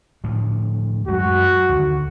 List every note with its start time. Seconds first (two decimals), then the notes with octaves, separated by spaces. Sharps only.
0.24 D2 A2 F3
1.08 F#2 G#3 F#4
1.69 D2 D3 D#3